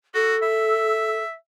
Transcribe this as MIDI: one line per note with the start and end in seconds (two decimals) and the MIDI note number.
0.14 0.36 66
0.14 1.19 69
0.42 1.35 76